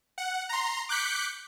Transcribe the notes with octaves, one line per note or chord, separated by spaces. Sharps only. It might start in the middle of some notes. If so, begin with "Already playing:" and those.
F#5
A#5 C6
D6 F#6 G6 B6 C#7